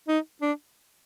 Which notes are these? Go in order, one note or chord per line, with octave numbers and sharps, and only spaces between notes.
D#4
D4